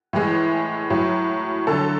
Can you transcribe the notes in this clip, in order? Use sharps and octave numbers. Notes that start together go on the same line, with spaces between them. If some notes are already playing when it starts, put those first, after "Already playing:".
A2 E3 G#3
A2 F#3
D3 F#3 A4